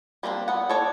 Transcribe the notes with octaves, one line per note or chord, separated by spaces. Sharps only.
G3 A#3 C4 D4
B3 F#5
A4 C#5 D5